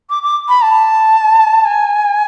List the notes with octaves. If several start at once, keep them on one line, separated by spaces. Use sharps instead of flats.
D6
D6
B5
A5
G#5